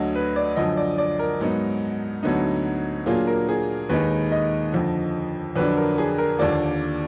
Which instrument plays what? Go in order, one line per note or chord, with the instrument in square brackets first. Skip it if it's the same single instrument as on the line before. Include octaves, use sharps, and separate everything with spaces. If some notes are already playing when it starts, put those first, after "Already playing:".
Already playing: [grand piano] D2 D3 F#3 D#5
B4
D5
F#2 D3 F3 D#5
D5
D5
A#4
G#2 F#3 B3 D#4
D2 D3 F#3 B3 D#4
A#2 F#3 A#3 D4 F4 G#4
A#4
G#4
D#2 D#3 G#3 D#4 B4
D#5
F2 D3 F3
F2 D3 F#3 D4 B4
A#4
G#4
A#4
D#2 D3 F3 A#3 D5